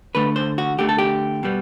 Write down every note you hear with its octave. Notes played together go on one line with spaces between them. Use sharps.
D2 D3 A3 B4
C5
F#4
D2 D3 A3 G4
A4
G4
B2 G3 B3